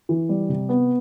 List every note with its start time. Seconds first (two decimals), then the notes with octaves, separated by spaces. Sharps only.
0.09 E3
0.29 G3
0.49 C3
0.69 B3